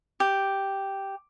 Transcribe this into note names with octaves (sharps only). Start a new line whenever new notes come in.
G4